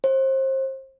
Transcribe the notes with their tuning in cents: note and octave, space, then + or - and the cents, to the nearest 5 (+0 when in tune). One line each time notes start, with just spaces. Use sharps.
C5 +30